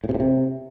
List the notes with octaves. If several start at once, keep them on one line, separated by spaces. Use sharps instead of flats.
A2
C3
A2
C3